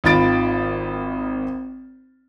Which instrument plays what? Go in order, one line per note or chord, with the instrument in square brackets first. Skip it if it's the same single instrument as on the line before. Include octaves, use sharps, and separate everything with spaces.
[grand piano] G#1 D#3 F4 B5 A6 D7